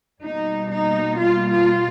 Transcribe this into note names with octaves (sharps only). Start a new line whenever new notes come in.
B2 G3 A#3 D#4
D#4
F4
F4